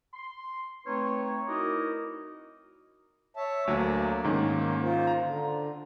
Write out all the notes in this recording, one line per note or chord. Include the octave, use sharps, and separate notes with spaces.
C6
A3 C4 D#4 B4 C#5
D#4 E4 F#4 A#4 D5 D#5
C#5 E5 A5
D2 F#3 A#3
G#2 D#3 C#4
F4 C5
A#5
D3